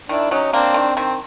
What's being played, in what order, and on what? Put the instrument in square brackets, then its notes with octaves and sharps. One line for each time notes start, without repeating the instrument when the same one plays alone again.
[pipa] D#3 [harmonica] D4 E4
[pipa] F#3 [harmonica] C#4 D#4
[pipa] A#3 [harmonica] C4 D4
[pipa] D#3
[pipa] D#3 [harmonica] C4